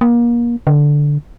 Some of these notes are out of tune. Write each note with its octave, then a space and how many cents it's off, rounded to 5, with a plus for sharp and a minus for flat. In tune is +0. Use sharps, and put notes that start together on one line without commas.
A#3 +30
D3 -5